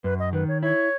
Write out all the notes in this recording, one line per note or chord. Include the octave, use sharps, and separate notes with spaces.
F#2 B4
D#5
D#3 B4
C#5
E4 C#5